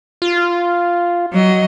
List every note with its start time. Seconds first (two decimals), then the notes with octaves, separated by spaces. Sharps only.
0.22 F4
1.33 F#3 D#5